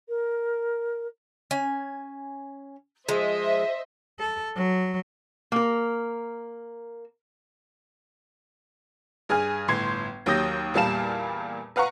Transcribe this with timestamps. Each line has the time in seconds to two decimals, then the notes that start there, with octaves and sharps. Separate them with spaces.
0.08 A#4
1.51 C#4 G#5
3.09 F3 G#3 C5 D#5 E5
4.19 A4
4.56 F#3
5.52 A#3 A#4
9.29 G2 G#4 G#5 F6
9.68 G1 A2 C6 G#6 C7
10.26 D#2 F#3 G4 D#6 G6 A#6
10.74 E2 A#2 G3 F5 A5 E7
11.76 B4 F5 F#5 A#5 C#6